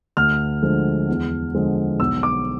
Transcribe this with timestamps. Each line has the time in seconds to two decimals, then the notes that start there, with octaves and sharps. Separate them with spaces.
0.17 D2 F6
0.62 D3 F3 G#3
1.08 E2
1.55 D3 F3 G#3
2.00 B1 E6
2.23 D6